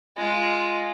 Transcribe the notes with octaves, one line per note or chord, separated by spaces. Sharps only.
G#3 F4